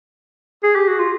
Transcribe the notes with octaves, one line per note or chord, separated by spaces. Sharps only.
G#4
G4
F#4
F4